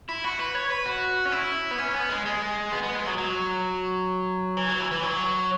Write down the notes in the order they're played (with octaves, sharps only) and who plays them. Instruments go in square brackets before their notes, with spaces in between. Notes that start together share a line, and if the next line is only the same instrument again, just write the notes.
[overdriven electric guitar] E4
F#4
B4
C#5
B4
F#4
C#4
E4
B3
C#4
B3
G#3
G#3
B3
B3
G#3
F#3
F#3
E3
F#3
E3
E3
F#3